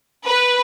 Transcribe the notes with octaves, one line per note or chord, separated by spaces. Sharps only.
B4